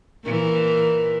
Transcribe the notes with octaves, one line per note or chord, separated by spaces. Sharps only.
A#2 E3 A#4